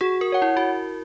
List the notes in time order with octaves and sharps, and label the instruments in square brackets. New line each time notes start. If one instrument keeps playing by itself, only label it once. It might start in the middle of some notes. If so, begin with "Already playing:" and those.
[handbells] F#4 [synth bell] G#4
[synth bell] A#4
[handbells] C#5 F#5
[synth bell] E4
F#4